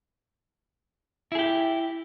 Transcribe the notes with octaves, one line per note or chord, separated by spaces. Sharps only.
E4 G4 G#4